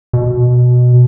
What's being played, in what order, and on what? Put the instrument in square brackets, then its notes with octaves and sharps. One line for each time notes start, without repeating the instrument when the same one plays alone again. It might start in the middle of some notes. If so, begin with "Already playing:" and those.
[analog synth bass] B2